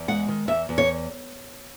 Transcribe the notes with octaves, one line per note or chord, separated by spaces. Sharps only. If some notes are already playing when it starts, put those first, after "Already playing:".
Already playing: E2
G#3 F#5
D#3
E2 E5
E2
C#5